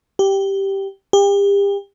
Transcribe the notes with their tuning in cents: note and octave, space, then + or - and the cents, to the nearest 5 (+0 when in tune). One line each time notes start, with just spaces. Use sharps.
G4 -5
G4 +35